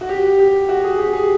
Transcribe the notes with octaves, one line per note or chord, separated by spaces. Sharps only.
F#4
G4
G4
F#4
G#4
G4
G#4